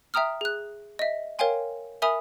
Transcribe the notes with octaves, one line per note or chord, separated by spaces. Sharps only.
E5 G5 A#5 D#6 F6
G#4 F#6
D#5 E5
A#4 C#5 F5 G5 G#5 C6
A#4 E5 G#5 B5 D#6 F7